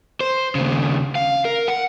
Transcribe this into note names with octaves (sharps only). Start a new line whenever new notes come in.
C5
D#2 C#3
F5
A#4
F#5